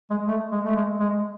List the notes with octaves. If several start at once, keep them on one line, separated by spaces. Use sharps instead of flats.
G#3
A3
G#3
A3
G#3
G#3